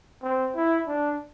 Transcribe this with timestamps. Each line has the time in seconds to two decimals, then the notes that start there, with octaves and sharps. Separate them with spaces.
0.23 C4
0.56 E4
0.88 D4